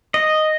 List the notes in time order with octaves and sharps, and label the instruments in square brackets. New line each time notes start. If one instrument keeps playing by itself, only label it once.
[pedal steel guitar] D#5